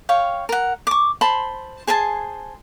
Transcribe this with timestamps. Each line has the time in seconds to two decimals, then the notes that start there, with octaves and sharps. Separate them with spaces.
0.09 C#5 F5 G5
0.49 A#4 F#5
0.87 C#6 D6
1.21 C5 A5 B5 C6
1.87 G#4 C5 G#5 A5